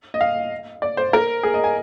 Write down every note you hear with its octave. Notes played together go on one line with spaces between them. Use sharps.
D#5
F5
D5
C5
A#4
G#4
D#5
G#5